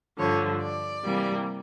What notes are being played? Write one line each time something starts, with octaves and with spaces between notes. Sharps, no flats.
G2 D3 F3 C#5
D5
C3 E3 G3 A#3